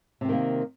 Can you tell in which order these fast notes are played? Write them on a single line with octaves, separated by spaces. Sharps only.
C3 C4 D#3 A#3